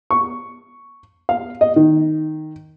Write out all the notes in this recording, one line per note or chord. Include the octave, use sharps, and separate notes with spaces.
C#6
F5
D#5
D#3